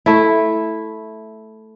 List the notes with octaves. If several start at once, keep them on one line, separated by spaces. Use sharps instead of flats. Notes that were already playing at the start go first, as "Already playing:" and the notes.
A3 E4